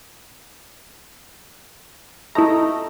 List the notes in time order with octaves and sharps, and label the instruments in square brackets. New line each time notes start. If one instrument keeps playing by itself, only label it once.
[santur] A3 D#4 [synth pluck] E4 A#5